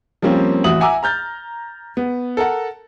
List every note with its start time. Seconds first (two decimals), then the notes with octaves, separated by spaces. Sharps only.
0.22 F3 G3 A#3 C4 C#4
0.64 A1 F#4 E5 D#6 F#7
0.80 E5 F#5 G#5 A#5 D6 E6
1.03 A#5 F6 G6 A6
1.97 B3
2.37 A4 A#4 F#5